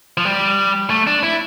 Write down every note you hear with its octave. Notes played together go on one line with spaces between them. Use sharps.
F3
G3
A3
D4
E4